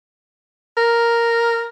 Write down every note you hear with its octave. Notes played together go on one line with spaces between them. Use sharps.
A#4